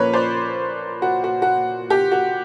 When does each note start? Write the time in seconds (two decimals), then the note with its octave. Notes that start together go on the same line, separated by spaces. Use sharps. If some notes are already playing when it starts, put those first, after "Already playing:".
Already playing: A#2 F3 A#3 C#4 B4 C#5
0.13 C5 D5
1.02 F#4
1.24 F#4
1.42 F#4
1.90 G4
2.12 F#4